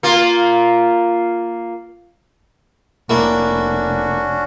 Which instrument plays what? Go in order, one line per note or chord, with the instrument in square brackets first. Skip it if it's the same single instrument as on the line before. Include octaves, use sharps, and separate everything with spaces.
[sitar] A#3 F4
[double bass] F1 [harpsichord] A#3 E4 [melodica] C#4 D4 F#4